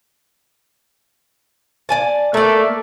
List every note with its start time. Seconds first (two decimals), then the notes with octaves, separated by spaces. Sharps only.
1.89 D5 G#5 A5
2.34 A3 A#3 D5